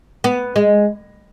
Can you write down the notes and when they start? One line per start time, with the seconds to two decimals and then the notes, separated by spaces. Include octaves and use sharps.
0.24 B3
0.56 G#3